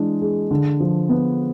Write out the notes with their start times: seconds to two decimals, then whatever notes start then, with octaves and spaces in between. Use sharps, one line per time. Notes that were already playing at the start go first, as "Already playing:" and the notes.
Already playing: E3 G#3 D4
0.22 G#4
0.51 D3
0.80 F3
1.09 B3